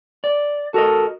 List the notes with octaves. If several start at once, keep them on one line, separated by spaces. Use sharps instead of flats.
D5
F#4 A4 A#4 D#5